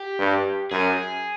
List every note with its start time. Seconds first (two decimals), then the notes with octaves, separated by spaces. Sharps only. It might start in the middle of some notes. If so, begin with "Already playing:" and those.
Already playing: G4
0.19 G2
0.71 F#2 G#4